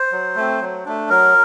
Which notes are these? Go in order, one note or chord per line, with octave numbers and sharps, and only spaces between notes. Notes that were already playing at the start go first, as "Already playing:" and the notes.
Already playing: C5
F#3
A3 C4
F#3
A3 D4
F#3 A#4